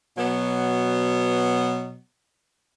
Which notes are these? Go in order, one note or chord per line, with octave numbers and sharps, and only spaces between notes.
B2 F#3 B3